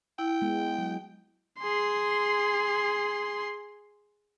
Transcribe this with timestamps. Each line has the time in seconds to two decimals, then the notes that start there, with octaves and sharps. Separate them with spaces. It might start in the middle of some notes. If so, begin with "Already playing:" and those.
0.19 E4 G5
0.42 G#3 B3
0.78 F#3
1.60 G#4 C6